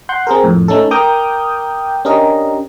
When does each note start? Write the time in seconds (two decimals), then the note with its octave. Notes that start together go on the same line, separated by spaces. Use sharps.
0.09 F#5 C6 F#6 G6
0.27 C4 G#4 A#4
0.44 F2 A2
0.68 A3 C#4 D#4 A4
0.91 A#4 G5 D6 D#6 F6 G6
2.05 C#4 D4 G4 A#4 D#5